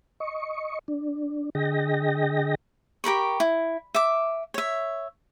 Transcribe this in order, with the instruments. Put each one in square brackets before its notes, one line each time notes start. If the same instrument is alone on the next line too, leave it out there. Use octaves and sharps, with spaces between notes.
[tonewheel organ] D#5 C#6
D4
D3 G#4 D#5 G5 A#6
[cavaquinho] G4 A#4 B5 C#6
E4
E5 D6
C#5 E5